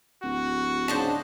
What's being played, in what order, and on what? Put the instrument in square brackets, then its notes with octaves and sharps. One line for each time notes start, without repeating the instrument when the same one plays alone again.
[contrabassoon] D1 [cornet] F#4
[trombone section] G#2 C#3 D4 [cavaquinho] C5 D#5 A5